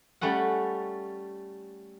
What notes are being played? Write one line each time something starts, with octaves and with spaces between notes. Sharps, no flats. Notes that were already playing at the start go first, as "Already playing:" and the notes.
G3 A3 C#4 F#5